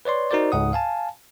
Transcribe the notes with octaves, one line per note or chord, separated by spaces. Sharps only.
B4 C#5 D5 C6
D#4 F#4 A#4 C5 D5
C#2 G#2 F#5 D#6
F5 G#5 A5